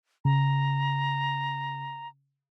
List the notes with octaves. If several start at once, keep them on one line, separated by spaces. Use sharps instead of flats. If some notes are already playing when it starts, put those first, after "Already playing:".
C#3 A#5